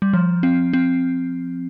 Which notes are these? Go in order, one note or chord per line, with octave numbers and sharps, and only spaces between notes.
G3
F3
C4
C4